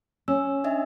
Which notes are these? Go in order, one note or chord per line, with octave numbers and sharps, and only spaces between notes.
C#4 E6
D4 D#5 E5